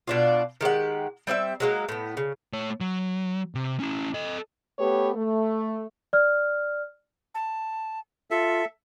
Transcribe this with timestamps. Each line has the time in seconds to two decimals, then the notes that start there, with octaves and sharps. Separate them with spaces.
0.07 B2 D4 F4
0.61 D#3 G#3 G4 F#5
1.27 G3 C4 D#5 E5
1.60 F#3 G#3 A#3
1.89 A2 B3
2.17 C#3
2.53 A3 C#5
2.81 F#3
3.55 C3
3.80 C#4 E4
4.14 A4 D#5
4.79 A3 B3 G4 B4 C#5
5.16 A3
6.13 D5 F6
7.35 A5
8.31 F4 A4 E5